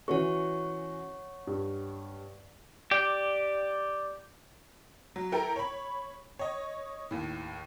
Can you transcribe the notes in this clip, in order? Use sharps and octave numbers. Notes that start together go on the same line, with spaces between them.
E3 C#4 F#4 C#5 F#5 C#6
G2
G4 D5
F#3
E4 A4 A#4 G5 A#5
C#5 B5
C#5 D#5
D#2 A2